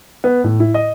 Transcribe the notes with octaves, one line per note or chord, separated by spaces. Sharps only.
B3
A2
E4
D#5